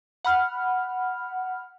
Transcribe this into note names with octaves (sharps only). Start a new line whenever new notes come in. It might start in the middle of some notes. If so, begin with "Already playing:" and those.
F#5 B5 F6